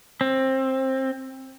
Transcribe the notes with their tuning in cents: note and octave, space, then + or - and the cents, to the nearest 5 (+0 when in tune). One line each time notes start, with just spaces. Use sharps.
C4 +20